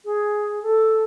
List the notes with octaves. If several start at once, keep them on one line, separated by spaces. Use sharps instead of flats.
G#4
A4